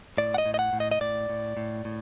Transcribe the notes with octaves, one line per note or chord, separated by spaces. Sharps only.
A2 D5
F#5
D#5
A2
D#5
F#5
A2
D#5
D#5
A2 D5
A2
A2
A2